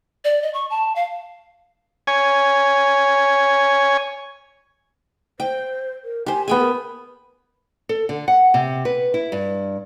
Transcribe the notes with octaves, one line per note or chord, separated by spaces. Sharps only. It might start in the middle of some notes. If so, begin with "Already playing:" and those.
D5
D#5
C#6
A5
F5
C#5 G#5
C5 G5
A#4
G4 C5 G#5
B3 G#4 G5 G#5
A#4
A4
D3
F#5
C3
B4
E4
G2